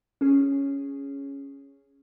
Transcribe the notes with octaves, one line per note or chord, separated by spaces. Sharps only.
C#4 G#4